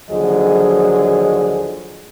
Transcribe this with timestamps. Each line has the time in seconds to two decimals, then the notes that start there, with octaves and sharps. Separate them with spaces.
0.11 D#2 D3 F3 F#3 G#4 D#5